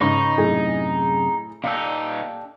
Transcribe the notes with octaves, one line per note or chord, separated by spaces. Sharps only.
G#2 C#3 D#4 B4 C#5
F#2 A2 C3 G#4
A#2 D4 D#4 G4 A4 F5